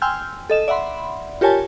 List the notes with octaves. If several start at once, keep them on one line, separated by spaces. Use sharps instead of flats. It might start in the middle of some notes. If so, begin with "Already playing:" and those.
G5 G#5 C6 E6 F6 G6
A4 D#5 E7
D5 E5 F#5 B5 C6
F4 G4 A#4 C#5 G#5 A5